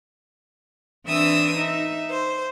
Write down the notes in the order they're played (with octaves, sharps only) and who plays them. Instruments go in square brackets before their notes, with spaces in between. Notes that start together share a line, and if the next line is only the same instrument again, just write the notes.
[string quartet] E3 C4 D4 E5 D#6 E6
D#4 E5
C5